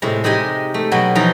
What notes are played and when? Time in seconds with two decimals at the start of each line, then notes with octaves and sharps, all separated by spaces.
0.02 A2 C3 G#3
0.24 G#3 D#4 G4 D#5 G#5
0.74 A3
0.91 B2 F#3 G5 G#5 B5
1.15 E3 F3 D#4 F5 G5 A#5